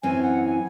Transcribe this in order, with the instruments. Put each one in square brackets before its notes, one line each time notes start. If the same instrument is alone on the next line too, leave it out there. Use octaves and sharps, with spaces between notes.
[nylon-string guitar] F#2 E3 C4 [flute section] G#5
[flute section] F#5
G#5